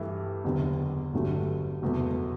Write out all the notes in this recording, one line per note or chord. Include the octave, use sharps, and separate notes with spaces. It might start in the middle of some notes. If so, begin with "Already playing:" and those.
Already playing: G2 E3 A3 E4 G4
F#1 E2 D3 G3
A1 G2 D3 F#3 A3
F#1 E2 B2 A3